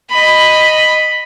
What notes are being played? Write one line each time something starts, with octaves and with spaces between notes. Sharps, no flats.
D#5 B5